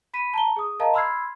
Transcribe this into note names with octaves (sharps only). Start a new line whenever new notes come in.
B5 B6 D#7
A5 A#5 G7
G#4 D#6
A#4 D#5 F5 A5 A#5
B5 C6 E6 F6 G#6 C7